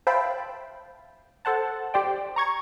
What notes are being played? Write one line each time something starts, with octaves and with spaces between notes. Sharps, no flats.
C5 E5 F5 G5 A5 B5
A4 C5 F#5 A5
G4 C5 D5 G5
A#5 C#6 G#6